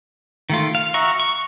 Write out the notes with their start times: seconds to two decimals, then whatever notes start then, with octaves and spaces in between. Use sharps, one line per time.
0.50 D#3 A3 F4
0.75 F5
0.94 F#4 E5 A#5 C#6
1.20 C#6